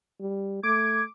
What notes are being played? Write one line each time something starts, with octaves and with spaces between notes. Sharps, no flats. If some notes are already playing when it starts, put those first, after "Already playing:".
G3
A3 D6 G#6